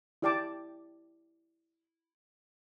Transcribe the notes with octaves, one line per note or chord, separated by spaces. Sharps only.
E4 G4 D5 G5 A5 D6